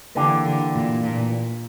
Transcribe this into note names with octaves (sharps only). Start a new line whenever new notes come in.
D3 E3 A#3 D4 G4
D3
A#2
A#2